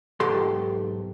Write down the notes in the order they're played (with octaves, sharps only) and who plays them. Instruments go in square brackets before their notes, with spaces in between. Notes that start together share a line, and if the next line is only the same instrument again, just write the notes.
[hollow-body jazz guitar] B1 G#2 G4 A4 C6